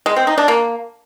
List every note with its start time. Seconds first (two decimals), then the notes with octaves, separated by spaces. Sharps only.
0.06 G#3
0.16 C4
0.27 D#4
0.38 D4
0.48 A#3